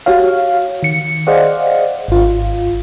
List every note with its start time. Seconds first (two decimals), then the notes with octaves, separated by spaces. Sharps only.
0.06 F#4 G4 C#5 F5
0.83 D#3 C#7
1.27 G#4 C5 D5 D#5 F5 F#5
2.08 G#1 F4